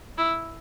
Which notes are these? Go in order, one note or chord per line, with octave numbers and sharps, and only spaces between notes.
E4